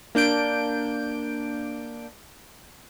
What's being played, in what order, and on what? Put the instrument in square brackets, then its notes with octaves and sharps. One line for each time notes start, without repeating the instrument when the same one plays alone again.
[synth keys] A#3 D4 G6 D7